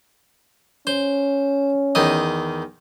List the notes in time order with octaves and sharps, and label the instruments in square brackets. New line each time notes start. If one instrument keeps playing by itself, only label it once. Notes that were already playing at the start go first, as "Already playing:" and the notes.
[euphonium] C#4 [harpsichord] C5
[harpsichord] E2 D#3 D#5